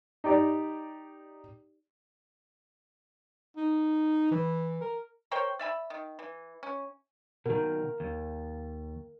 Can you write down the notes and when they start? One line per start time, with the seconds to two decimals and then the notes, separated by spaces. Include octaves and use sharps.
0.24 D#4 G4 D5 A#5
3.57 D#4
4.31 E3
4.81 A#4
5.31 A#4 C5 C#5 G5
5.59 D5 E5 G#5 B5
5.90 D#3
6.19 E3
6.63 C#4
7.46 B2 D#3 A#4
8.00 D#2